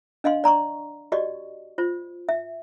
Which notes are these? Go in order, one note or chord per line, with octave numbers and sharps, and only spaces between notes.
D4 D#5 F5 C6
D5 A#5 C6 C#6
F#4 G4 D5 D#5 C#6
F4 C5
E5